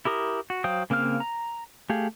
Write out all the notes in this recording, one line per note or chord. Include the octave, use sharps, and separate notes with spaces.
E4 G4 A#4 D#6
F#4
F#3 C5 F5 G5 D#6
C#3 A#3 C4 F5 F6
A#5
A3 G4 G#4 F5